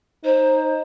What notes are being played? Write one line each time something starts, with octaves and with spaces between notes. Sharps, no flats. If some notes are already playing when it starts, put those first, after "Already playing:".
D#4 C5